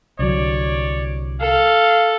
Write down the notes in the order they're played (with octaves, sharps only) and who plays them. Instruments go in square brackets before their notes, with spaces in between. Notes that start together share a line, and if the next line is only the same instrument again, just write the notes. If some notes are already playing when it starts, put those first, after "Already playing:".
[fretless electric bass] C2 D3 F#3 [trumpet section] C#5 D5
[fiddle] A4 [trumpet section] F5